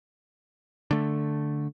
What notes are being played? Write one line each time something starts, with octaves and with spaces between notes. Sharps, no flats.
D3 A3